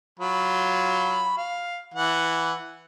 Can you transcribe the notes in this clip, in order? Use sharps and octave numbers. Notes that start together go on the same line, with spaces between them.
F#3 F4 B5
F5
E3 F#5